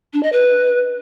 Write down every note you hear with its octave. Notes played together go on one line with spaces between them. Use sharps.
D4
D#5
B4